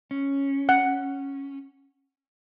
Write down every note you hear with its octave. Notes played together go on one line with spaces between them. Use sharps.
C#4
F#5